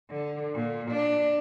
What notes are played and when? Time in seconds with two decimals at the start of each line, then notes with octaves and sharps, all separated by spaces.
0.11 D3
0.54 A#2
0.91 D4